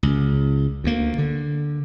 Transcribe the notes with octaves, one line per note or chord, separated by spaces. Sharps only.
C#2
D2 A#3
D3